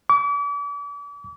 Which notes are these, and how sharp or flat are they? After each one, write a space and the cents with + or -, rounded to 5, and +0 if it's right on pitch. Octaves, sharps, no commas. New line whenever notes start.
D6 -40